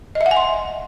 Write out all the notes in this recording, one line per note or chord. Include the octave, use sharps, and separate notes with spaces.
D#5
E5
F#5
G#5
C6